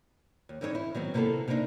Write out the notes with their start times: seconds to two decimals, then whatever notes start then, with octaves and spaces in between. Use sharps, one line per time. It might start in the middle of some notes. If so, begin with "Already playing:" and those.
0.49 D#2
0.61 G2 E3 C4 D#4 A4 C#5
0.75 E4
0.95 D#3 F#3 B3 C4
1.14 C3 A#3 B3 E4 A4
1.48 C3 A#3 C4 D4 D#4